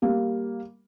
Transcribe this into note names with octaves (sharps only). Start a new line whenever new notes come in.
G3 A#3